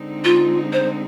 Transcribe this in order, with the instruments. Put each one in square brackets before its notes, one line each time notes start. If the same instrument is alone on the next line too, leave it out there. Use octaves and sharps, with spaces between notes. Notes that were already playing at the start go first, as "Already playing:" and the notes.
Already playing: [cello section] D3 G#3 C4 D#4
[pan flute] F4
C5